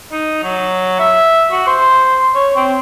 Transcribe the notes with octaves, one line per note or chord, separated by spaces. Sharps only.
D#4
F#3
E5
F#4
C5
C#5
C4